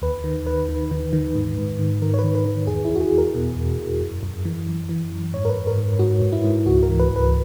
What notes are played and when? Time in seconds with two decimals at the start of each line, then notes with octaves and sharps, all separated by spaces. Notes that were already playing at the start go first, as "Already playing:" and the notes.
0.02 D#2 B4
0.24 D#3
0.47 D#3 B4
0.69 D#3
0.91 D#3
1.13 D#3
1.36 G#2
1.58 G#2
1.79 D#3
2.02 D#3 A#4
2.14 C#5
2.19 B4
2.24 D#3
2.35 B4
2.45 D#3
2.67 E2 G#4
2.85 E2 E4
2.96 F#4
3.01 G#4
3.12 E2
3.18 A#4
3.34 B2
3.56 E2
3.79 B2
4.01 F#2
4.23 F#2
4.45 E3
4.67 F#2
4.89 E3
5.12 F#2
5.33 G#2 C#5
5.45 A#4
5.49 B4
5.55 G#2
5.67 A#4
5.78 G#2
5.99 G#2 F#4
6.22 G#2
6.33 E4
6.44 G#2
6.66 C#2 F#4
6.83 A#4
6.88 E3
7.00 B4
7.10 C#2
7.16 B4